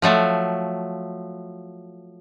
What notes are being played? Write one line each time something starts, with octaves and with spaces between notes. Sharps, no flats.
F3 F#3 A3